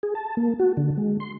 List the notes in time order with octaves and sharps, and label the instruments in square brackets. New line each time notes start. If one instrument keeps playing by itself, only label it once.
[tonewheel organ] G#4
A5
A#3
F#4
D3
G#3
C6